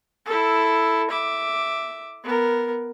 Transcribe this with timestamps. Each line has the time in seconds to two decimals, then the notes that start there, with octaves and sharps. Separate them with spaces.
0.26 E4 A4
1.10 E5 D6
2.24 B3 A#4